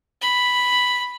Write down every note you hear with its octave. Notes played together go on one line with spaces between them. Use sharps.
B5